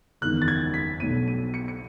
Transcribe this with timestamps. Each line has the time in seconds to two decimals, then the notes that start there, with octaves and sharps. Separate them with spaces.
0.21 F#1 E2 D#3 G#3 B3 F#6
0.42 A6
0.48 G#6
0.74 B6
1.00 B1 B2 F#3 D#7
1.28 D#7
1.54 C#7
1.68 C#7